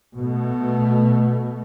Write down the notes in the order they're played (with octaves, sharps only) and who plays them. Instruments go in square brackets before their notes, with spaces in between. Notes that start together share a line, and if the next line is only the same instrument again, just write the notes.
[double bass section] B2 A3